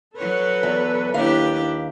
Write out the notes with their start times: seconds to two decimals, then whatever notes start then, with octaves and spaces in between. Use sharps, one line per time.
0.17 F#3 A4 B4 C#5
0.63 E2
1.14 D#2 D4 E4 G4 F5